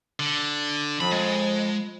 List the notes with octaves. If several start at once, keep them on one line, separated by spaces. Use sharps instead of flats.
D3
F2 B5
G#3